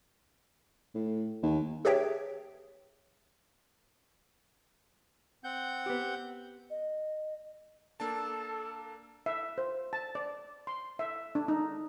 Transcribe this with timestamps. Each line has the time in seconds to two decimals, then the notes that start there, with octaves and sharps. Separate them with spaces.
0.95 A2
1.43 D#2
1.85 G4 G#4 B4 C#5 E5 G5
5.44 C4 F#5 G6
5.86 B3 G4
6.70 D#5
8.00 A#3 D4 A4 A5
9.26 E5
9.58 C5
9.93 A5
10.15 D5
10.67 C6
10.99 E5
11.35 D4
11.48 D#4